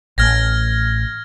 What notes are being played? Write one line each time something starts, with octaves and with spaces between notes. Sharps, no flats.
A1 F6 G#6 A#6